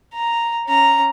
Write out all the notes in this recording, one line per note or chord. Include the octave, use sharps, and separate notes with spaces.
A#5
C#4 A#5